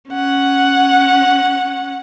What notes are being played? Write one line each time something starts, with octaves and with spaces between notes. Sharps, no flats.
C#4 F#5